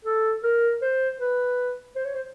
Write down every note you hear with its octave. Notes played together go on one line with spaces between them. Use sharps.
A4
A#4
C5
B4
C5
C#5
C5